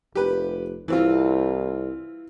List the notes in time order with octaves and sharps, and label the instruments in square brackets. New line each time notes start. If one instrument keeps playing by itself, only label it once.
[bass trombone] F1 [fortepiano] G4 B4
[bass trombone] C2 [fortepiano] E3 C4 F4